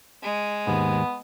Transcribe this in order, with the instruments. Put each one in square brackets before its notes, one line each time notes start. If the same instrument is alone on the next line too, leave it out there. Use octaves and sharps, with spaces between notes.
[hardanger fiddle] G#3
[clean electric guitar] D#2 G#2 [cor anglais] B3